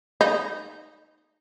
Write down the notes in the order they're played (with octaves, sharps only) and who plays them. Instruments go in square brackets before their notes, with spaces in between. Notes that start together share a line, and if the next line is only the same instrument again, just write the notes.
[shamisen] D#4